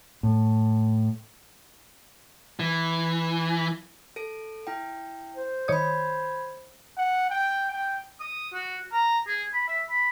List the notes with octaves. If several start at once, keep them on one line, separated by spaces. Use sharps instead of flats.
A2
E3
A4 D7
E4 G5
C5
D#3 C#5 B5 D#6 G#6
F#5
G5
G5
D#6
F#4
A#5
G#4
B5
E5
B5